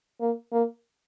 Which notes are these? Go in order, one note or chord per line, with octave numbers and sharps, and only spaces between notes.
A#3
A#3